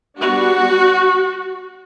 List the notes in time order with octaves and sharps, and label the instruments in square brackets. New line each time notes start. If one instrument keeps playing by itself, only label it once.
[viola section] G3 B3 D4 F#4